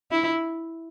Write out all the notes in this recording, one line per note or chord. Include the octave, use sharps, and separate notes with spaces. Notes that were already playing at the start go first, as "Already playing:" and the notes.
E4